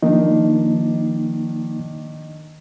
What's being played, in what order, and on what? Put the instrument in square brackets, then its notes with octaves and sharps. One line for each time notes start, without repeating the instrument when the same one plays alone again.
[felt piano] D#3 D4 [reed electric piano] F3 A#3 D#4